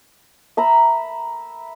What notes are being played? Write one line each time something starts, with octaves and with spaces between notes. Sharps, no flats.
E5 A#5 B5